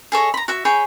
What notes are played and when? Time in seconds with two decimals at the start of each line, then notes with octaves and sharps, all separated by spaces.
0.12 G#4 A4 C#5 D#5
0.34 A#5 B5
0.48 F#4 E5
0.65 G#4 C#5 G5 B5